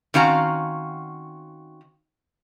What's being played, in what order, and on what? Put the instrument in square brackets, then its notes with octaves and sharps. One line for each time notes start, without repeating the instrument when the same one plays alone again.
[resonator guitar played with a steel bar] D#3 C4 C#4 F#4 F5 A#5